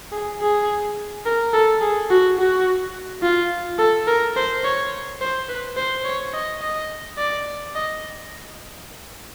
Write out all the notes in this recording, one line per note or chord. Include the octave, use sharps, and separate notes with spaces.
G#4
G#4
A#4
A4
G#4
F#4
F#4
F4
A4
A#4
C5
C#5
C5
B4
C5
C#5
D#5
D#5
D5
D#5